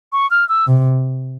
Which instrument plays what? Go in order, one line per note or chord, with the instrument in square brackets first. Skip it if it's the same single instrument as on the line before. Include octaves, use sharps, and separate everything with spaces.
[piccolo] C#6
F6
E6
[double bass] C3